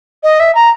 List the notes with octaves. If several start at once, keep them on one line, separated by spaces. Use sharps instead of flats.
D#5
E5
A#5